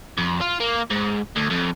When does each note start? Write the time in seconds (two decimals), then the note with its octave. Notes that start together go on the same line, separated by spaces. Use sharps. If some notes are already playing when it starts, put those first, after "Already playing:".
0.17 F2
0.41 F4
0.60 A#3
0.91 G#2
1.36 D2
1.50 F2